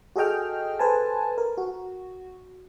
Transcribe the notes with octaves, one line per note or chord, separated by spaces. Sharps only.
F#4 G#4 A4 D#5 G5 F6
A4 B4 C5 G#5 A5
A#4
F#4